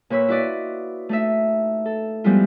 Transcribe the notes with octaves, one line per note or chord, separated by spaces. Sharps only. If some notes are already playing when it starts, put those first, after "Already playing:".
A#2 B4 C#5 B5 E6
E4 F#4 B4 D5 D#5
A3 D#4 E5
A4
F3 G3 G#3 B3 E4 F4